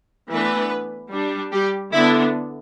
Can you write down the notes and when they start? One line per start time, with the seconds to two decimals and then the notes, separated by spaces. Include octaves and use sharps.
0.30 E3 A3 B3 D4 B4
1.12 G3 D4
1.52 G3 G4
1.92 D3 B3 D4 E4